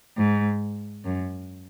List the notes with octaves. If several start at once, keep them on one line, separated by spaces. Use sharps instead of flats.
G#2
F#2